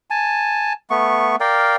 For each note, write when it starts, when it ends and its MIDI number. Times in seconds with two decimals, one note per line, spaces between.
0.10 0.73 80
0.10 0.73 81
0.90 1.36 57
0.90 1.36 59
0.90 1.36 85
1.40 1.76 70
1.40 1.76 74
1.40 1.76 77
1.40 1.76 79